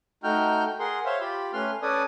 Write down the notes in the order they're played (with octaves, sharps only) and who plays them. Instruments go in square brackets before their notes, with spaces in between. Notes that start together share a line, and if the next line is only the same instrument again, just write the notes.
[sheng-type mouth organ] A3 D#4 F#4 G5 F6 G6
G#4 A#4 F#5 C6
C5 C#5 E5 F5 C6
F4 G4 B5
A3 C#4 B4 C6 F6
C#4 A4 B4 D5 G#5 D#6